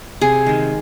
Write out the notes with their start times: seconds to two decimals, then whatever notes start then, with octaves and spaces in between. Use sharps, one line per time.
0.21 C3 G#4
0.46 D#3 G#3